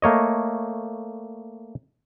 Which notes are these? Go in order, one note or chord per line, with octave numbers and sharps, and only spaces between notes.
A3 A#3 C#5 D#5